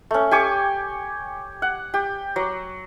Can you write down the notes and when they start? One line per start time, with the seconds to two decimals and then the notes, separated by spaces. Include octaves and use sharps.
0.11 A3 C#4
0.31 G4 G#5 C#6 D6
1.62 F#5
1.94 G4
2.36 F#3